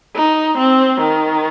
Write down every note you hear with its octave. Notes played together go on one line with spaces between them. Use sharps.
D#4
C4
D#3